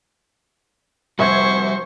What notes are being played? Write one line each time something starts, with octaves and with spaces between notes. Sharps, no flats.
F1 G3 F#4 C5 E5 C#6 G#6